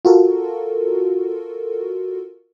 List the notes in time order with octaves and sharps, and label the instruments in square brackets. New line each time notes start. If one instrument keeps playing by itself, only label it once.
[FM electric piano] F4 F#4 A4 A#4